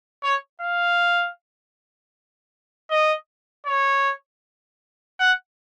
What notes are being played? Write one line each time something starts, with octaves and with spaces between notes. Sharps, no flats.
C#5
F5
D#5
C#5
F#5